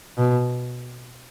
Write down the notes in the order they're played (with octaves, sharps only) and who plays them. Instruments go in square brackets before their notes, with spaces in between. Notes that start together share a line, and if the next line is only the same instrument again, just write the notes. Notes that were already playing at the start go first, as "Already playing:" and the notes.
[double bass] B2